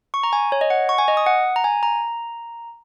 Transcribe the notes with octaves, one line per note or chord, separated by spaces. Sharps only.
C#6
A#5
G#5
C#5
D#5
F#5
C#6
G#5
D#5
D#6
F#5
A#5
G#5
A#5